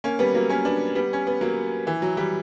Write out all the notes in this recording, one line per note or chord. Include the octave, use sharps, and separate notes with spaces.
A#3 C#4
G3 B3
F#3 A#3
A#3 C#4
B3 D4
G3 B3
C#4
B3
F#3 A#3
E3
F#3
E3 G3